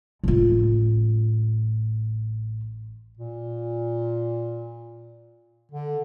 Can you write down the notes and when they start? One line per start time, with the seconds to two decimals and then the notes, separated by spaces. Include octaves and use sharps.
0.24 A1 F4
3.17 A#2
5.72 D3